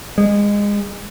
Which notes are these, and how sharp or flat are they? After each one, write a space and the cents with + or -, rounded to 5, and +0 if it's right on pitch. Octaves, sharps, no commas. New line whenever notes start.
G#3 -25